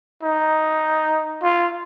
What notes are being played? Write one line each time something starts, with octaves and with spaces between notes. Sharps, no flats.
D#4
F4